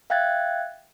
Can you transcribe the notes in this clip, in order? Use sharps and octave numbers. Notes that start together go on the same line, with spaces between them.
E5 F5 G5 F#6 G#6 A6